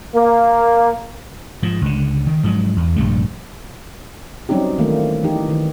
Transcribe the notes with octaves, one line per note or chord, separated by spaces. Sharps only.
A#3
G#2 F3
C#2 D3
D#3
G#2 F3 F#3
E2
A#1 G2 C3 A3
F#3 G3 C4 C#4 D#4 G4
D#3 E3 A3 A#3
E3 D#4 G4
D#3